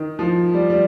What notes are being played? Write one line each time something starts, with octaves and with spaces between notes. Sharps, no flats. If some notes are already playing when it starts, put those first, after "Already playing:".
Already playing: D#3
F3
G3
G3